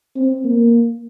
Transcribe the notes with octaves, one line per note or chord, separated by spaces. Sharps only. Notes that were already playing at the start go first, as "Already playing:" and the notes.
C4
A#3